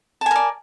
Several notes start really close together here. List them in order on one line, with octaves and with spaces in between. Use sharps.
A5 G#5 A#4 D5